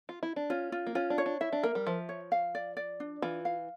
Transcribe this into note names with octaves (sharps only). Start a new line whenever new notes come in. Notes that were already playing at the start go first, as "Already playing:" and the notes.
F4
E4
D4
C#4 F4
F4
A#3
C#4 F4
D4
C#5
D4
E4 E5
D4
A#3 A#4
G3
F3 E5
C#5
F5
D5
D5
D4
E3 F4
F5